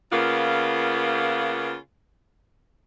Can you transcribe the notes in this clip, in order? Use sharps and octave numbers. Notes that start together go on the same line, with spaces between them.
C#3 A#3 B3 F4